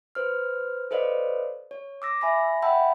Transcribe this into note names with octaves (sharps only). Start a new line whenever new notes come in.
B4 C5 F6
A4 B4 C5 D5 D#5 F5
C#5
D6 E6 A#6
E5 G#5 B5 A#6
E5 F#5 G5 A5 B5 E6